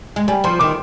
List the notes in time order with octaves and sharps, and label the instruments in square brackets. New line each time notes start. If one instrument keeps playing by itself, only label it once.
[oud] G#3
[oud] G3 [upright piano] G#5
[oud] F3 [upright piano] C6
[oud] D#3 [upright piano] D6